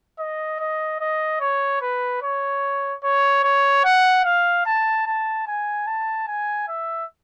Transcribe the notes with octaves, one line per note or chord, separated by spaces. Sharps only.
D#5
D#5
D#5
C#5
B4
C#5
C#5
C#5
F#5
F5
A5
A5
G#5
A5
G#5
E5